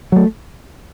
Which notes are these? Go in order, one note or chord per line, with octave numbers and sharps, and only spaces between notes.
F#3 A3